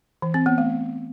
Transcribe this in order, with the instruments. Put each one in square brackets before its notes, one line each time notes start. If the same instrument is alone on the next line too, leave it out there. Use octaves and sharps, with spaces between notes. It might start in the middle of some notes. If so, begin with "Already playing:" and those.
[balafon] E3
C4
B3
A3